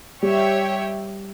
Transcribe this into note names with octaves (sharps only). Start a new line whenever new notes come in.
G3 G4 C#5 E5 G5